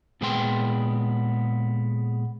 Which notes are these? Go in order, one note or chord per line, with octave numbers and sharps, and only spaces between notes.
A#2 G#3 B3 G5 C6